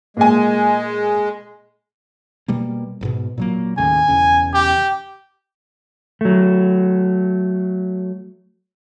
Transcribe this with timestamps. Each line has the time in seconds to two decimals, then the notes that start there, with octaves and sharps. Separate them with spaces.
0.17 A#2 G#3 G#5
2.48 B2 G3 A#3
3.01 A1 G#2 B2
3.38 A#2 F#3 A#3
3.78 D#2 A2 C#3 G#5
4.08 E1 E2 C#3
4.54 G4
6.21 F#3 A3